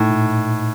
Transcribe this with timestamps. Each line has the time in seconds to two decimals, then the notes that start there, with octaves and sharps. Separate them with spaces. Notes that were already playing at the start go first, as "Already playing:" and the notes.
Already playing: A2 D#4
0.10 A#2